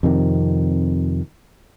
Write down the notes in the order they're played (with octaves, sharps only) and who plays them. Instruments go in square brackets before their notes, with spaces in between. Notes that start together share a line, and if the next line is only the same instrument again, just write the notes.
[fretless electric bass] F2 C3 D#3